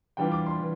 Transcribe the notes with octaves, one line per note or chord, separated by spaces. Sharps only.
E3 G3 D4 F4 G5
D6
C6
E3